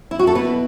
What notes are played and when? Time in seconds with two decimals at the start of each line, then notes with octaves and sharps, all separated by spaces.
0.11 E4
0.19 F#4
0.27 A4
0.35 B2 B3 E4 B4